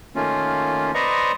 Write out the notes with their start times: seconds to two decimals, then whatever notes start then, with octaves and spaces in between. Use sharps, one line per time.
0.15 D#3 A3 A#3 C#4 F4
0.94 B4 C5 D5 D#5 A#5 C#6